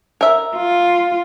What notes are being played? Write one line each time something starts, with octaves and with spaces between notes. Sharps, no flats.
A#4 E5
F4